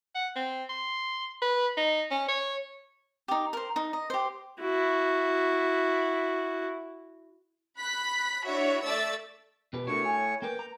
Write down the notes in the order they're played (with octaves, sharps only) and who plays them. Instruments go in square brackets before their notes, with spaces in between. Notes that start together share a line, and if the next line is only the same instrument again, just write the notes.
[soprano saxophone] F#5
C4
C6
B4
D#4
C#4
C#5
[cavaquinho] D#4 G4
A#4 C5
D#4
D#5
G4 C5
[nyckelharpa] E4 F#4
[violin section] B5 F#6 B6
D4 E4 F#4 C#5 E5
A3 D5 E5 E6 A6
[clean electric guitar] B2 G4 B4
[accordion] A2 C#5 [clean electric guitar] D4 F#4 A#4
[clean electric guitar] G#5
[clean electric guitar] A#3 A#4 B4 [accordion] G5
[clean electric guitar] A#5